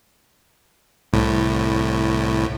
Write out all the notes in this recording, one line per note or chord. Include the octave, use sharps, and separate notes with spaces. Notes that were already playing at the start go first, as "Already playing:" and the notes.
C2 A2